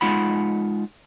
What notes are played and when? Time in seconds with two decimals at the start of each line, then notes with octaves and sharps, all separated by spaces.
0.01 G#3 D#4 F4 F#5 B5